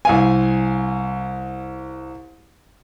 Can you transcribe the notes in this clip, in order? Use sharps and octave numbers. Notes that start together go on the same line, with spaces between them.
C2 F5 G#5